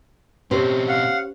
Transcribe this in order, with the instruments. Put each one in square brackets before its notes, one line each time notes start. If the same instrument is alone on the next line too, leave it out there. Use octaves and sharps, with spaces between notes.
[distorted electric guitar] B2 C4 [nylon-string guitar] C#4 G4 C5
[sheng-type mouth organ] F5 F#5